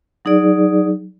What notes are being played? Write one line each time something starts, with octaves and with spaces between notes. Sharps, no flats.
F#3 D#4 G#4 D5